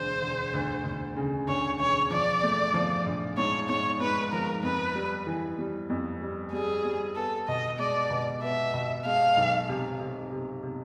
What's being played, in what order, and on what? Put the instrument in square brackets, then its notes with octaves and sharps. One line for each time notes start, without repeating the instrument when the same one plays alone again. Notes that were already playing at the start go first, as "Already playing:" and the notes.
Already playing: [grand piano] E1 D2 [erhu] C5
[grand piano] E1
D2
D2
C#3
[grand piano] D2 [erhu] C#5
[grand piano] E1 [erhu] C#5
[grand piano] F3 [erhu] D5
[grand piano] A3
F3
A#1
[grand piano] G#2 [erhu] C#5
[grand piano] G#2 [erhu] C#5
[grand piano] G#2 [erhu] B4
[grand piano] F3 [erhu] A#4
[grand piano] F2 [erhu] B4
[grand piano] G3
E3
G3
F2
G3
[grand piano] G3 [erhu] G#4
[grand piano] G3
[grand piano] B3 [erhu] A4
[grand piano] B2 [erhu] D#5
[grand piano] G#3 [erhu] D5
[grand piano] B2
[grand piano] B3 [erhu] E5
[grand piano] B2
[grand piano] G#3 [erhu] F5
[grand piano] B1
C3
C3
C3
C3